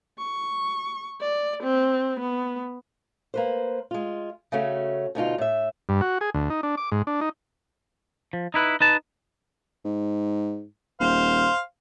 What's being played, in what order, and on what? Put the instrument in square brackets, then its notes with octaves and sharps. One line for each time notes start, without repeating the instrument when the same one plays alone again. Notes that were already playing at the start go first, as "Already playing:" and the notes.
[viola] C#6
D5
C4
B3
[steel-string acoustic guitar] A#3 B4 C5
G#3 F4
C#3 A3 C#4 F#4
D2 B2 D#4 F4
A2 E5
[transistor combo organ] G2
F#4
G#4
D2
D#4
D4
D6
G#2
D4
D#4
[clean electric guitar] F3
D#4 E4 B4
D#4 B4 A5
[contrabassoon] G#2
[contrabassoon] D#1 [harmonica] C5 F5